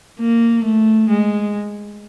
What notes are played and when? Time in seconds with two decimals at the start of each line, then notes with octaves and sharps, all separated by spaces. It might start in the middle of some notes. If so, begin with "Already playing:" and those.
0.20 A#3
0.64 A3
1.09 G#3